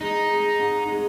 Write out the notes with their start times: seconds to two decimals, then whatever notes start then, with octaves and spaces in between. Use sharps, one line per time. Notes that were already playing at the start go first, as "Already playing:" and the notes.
0.01 G#3 D#4
0.30 G#3
0.59 G#2
0.89 G#3